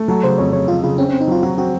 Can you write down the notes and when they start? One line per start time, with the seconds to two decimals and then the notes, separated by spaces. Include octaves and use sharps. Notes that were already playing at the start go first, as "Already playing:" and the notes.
Already playing: A3
0.08 F#3 A4
0.24 C#3 C5
0.38 F2 C#5
0.53 C#3 C#5
0.68 F2 F4
0.83 C#3 F4
0.98 C4 C#4
1.09 C4 C#4
1.21 D#4
1.28 F#3 F4
1.42 F#3 F#4
1.58 C4 F#4